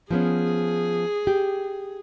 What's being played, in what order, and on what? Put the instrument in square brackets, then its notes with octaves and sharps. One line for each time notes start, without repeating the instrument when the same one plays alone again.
[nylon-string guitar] F3 B3 C#4 [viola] G#4
[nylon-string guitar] G4